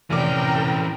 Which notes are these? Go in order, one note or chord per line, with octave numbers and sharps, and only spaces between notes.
F1 E3 C#4 A#4 D5 G5 D6